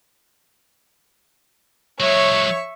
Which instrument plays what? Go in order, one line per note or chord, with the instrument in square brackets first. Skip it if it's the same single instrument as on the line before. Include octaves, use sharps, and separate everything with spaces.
[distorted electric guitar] F#3 G#3 [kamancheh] C#5 [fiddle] E5 C#6